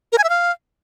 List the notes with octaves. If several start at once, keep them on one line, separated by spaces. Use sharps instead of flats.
A#4
G#5
E5
F5